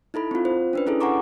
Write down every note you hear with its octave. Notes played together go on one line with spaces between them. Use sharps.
D#4 E4 A4 B5
C4 F4
C5
C#4 D4 B4
C#4 E4 G#4 A4
F#5 G#5 A#5 C#6 D6